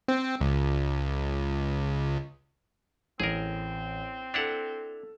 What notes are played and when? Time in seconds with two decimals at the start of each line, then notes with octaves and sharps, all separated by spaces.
0.08 C4
0.41 C#2
3.20 A1 C4 G#4 A#4
4.34 D4 E4 A4 F#5 E7 F7